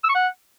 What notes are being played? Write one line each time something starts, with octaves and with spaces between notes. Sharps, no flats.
E6
C#6
F#5